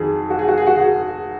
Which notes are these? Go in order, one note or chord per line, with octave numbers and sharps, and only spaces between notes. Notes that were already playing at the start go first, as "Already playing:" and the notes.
Already playing: F2 D#3 F#3 G#4
F#4
G#4
F#4
G#4
F#4
G#4